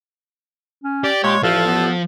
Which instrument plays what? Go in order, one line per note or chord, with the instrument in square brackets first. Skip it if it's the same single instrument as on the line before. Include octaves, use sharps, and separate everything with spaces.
[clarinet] C#4
[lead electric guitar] G4 [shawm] D5
[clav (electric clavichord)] A#2 [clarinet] G#3 [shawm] C#5
[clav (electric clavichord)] A1 [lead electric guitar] F3 [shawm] A4 [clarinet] F5
[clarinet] B3